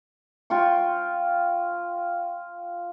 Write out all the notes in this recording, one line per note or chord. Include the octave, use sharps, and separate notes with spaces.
F4 G5 C#6